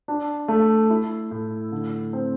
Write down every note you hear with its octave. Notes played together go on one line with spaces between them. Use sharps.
D4
A3
E4
A2
D3
C4